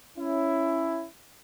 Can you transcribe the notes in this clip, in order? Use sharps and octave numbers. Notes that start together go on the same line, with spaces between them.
C#4 E4